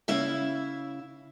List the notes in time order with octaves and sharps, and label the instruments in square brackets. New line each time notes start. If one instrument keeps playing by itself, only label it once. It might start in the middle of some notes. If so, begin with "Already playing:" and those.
[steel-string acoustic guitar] C#3 E4 E5 F5